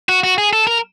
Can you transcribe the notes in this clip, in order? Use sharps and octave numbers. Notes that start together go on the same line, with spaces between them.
F#4
F#4
G#4
A4
A#4